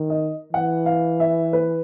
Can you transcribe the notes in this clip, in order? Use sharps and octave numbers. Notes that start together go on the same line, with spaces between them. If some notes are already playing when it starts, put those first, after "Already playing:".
Already playing: D#3
D#5
E3 F#5
F5
E5
B4